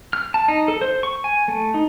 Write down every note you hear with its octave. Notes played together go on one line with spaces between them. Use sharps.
F6
A5
D#4
A4
C5
C#6
G#5
A3
D#4